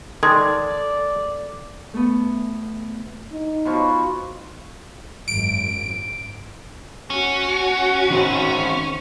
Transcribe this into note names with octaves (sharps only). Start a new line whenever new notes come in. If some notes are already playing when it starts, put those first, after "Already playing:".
D#3 G#3 A4 D5 C6 D#6 G#6 A6
A3 B3
D#4
B2 F3 C#6
G#1 F#2 D7
C#4 F#4
D#3 C4